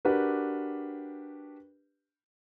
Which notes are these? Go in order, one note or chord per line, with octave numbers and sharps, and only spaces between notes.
D4 F#4 G4 A#4 B4